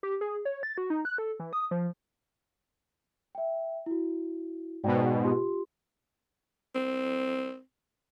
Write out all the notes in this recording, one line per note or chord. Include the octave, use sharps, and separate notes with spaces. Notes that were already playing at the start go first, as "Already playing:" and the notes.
G4
G#4
C#5
A6
F#4
D#4
F#6
A4
E3
D#6
F3
E5 G5
E4 F#4
G#2 B2 F#4 D5 G5
F4 G4 C6
C4